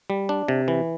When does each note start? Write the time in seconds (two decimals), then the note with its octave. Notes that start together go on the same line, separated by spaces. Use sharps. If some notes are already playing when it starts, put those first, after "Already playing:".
0.10 G3
0.29 D4
0.48 C3
0.68 E3